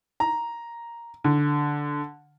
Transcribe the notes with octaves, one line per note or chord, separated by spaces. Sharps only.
A#5
D3